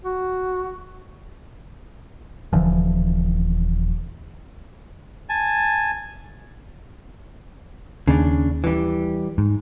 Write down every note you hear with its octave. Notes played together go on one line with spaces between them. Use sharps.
F#4
D#1 D3 E3 F3
G#5 A5
D#2 C#3 D4
E3 G3
G#2